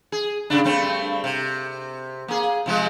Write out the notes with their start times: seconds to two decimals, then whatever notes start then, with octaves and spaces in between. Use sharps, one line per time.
0.12 G#4
0.50 G2 C#3 D4
0.64 G2 A3 C4
1.24 C3
2.28 A#3 G#4
2.66 C3 F3 G#3